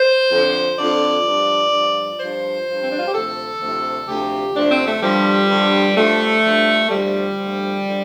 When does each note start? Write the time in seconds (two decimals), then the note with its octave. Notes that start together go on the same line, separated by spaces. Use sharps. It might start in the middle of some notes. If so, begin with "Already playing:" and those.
Already playing: C5
0.31 F2 D3 F3
0.78 F2 D3 F3 D5
1.26 G2 F3
1.72 G2 F3
2.20 G2 F3 C5
2.67 G2 F3
2.82 C4
2.90 D4
2.98 F4
3.06 G4
3.14 D2 C3 F3 A4
3.61 D2 C3 F3
4.08 D2 C3 F3 G4
4.55 D2 C3 F3 D4
4.71 C4
4.88 A3
5.02 G2 D3 F3 G3
5.49 G2 D3 F3
5.97 G2 D3 F3 A3
6.44 G2 D3 F3
6.91 D2 D3 F3 G3
7.39 D2 D3 F3
7.85 D3 F3